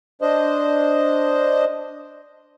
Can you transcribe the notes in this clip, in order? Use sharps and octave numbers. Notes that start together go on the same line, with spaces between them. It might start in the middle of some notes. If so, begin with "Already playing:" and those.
D4 C5 D#5